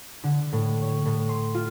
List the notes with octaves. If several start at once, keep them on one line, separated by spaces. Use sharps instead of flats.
D3
A2
C#5
A2
C6
F4